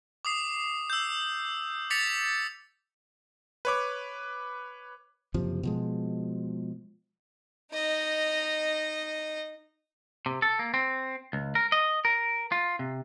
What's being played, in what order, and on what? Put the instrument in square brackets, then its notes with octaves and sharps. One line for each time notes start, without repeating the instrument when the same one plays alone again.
[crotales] D6 D#6 C7
E6 G6
D6 A6 B6 C#7 F7
[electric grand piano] B4 C#5 D6
[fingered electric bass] F#1 C3 F3
B2 F3 G#3
[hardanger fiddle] D#4 D#5
[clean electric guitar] C3
A4
A#3
C4
C#2
A#4
D#5
A#4
F4
C3